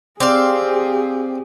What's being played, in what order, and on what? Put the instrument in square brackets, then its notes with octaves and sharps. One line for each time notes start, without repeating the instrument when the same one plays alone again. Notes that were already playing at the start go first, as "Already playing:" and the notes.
[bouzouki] C4 F5 [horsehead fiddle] G4 G#4 [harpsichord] D5